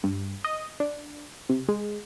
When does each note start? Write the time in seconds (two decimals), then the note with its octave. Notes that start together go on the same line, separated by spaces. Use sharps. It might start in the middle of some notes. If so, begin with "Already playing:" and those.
0.03 G2
0.44 D#5
0.80 D4
1.49 C3
1.69 G#3